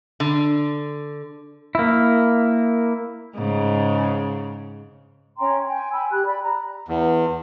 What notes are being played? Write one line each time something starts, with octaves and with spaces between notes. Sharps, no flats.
D3
A#3 E4
G#2 C#3
C#4 G5 A#5 C6
G5 G#5
G#5 B5 E6
G4 F#6
D5 B5
A#5
E2